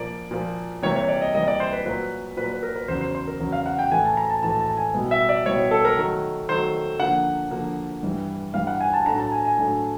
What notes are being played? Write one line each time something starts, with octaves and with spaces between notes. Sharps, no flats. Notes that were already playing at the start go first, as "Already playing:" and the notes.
Already playing: A#2 F3 A#3 D5
A#2 F3 A#3
C3 E3 G3 A#3 C#5
C#5
D5
D#5
C3 E3 G3 A#3 D#5
D5
C5
B4
A#2 F#3 A#3 B4
A#2 F#3 A#3 B4
B4
A#4
B4
E2 C#3 F#3 C5
C5
C5
A#4
E2 C#3 F#3
F5
F#5
G5
A2 E3 A3 G#5
A5
A#5
A5
A2 E3 A3 A5
A5
G#5
B2 G3 B3 E4
E5
D5
B2 G3 B3 E4 C#5
A4
A#4
D#3 F#3 A3
D#3 F#3 A3 C5
D3 F3 A#3 F#5
D3 F3 A#3
G2 E3 G3
G2 E3 G3 F5
F#5
G#5
A5
A2 F#3 A3 D4 A#5
A5
G#5
G#5
A2 F#3 A3 D4